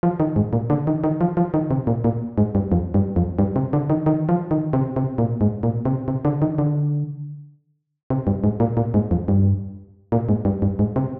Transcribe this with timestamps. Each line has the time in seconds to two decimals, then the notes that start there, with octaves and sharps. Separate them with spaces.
0.03 F3
0.20 D#3
0.36 G#2
0.53 A#2
0.70 D3
0.87 D#3
1.04 D#3
1.21 F3
1.37 F3
1.54 D#3
1.71 C3
1.87 A#2
2.04 A#2
2.38 G#2
2.55 G2
2.72 F2
2.94 G2
3.16 F2
3.39 G2
3.56 C3
3.73 D3
3.90 D#3
4.06 D#3
4.29 F3
4.51 D#3
4.73 C3
4.96 C3
5.18 A#2
5.41 G#2
5.63 A#2
5.85 C3
6.08 C3
6.25 D3
6.42 D#3
6.58 D3
8.10 C3
8.27 G2
8.44 G#2
8.60 A#2
8.77 A#2
8.94 G#2
9.11 F2
9.28 G2
10.12 A#2
10.29 G#2
10.45 G2
10.62 G2
10.79 G#2
10.96 C3